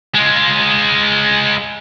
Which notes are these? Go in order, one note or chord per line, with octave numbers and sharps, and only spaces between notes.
G#3 F4